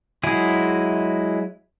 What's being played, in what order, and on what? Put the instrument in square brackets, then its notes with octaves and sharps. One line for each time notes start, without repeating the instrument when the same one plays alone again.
[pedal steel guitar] F#3 G#3 E4 G#4